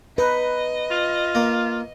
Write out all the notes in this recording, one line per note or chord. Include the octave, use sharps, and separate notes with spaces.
D#4 B4 D#5
F4
A#3